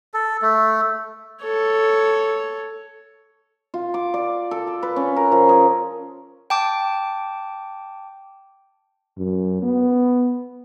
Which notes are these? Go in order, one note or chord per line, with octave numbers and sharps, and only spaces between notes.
A4
A3
A4 C#5
F4
D6
D5
A4
A5
B4
C#4
A#4
F3
G#4
G5 A5 D6
F#2
B3